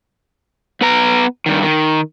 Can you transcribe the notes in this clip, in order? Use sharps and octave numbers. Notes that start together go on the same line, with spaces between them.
B3 B4 A#5
G2 D#3
D#3